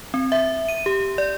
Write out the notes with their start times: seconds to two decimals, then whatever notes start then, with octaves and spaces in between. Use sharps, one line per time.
0.14 C4
0.32 E5
0.69 D#7
0.86 G4
1.18 D5